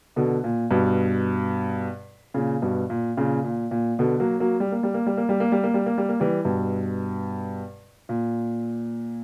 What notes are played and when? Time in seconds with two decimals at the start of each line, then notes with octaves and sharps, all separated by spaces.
0.16 B2 D3
0.44 A#2
0.71 G2 B2
2.34 A#2 C#3
2.62 G2 B2
2.90 A#2
3.17 A#2 C#3
3.44 A#2
3.71 A#2
3.99 B2 D3
4.20 F#3 A#3
4.40 F#3 A#3
4.60 G3
4.72 A#3
4.83 G3
4.94 A#3
5.07 G3
5.17 A#3
5.29 G3
5.40 A#3
5.52 G3
5.63 A#3
5.74 G3
5.86 A#3
5.98 G3
6.09 A#3
6.20 E3 G3
6.45 G2 B2
8.09 A#2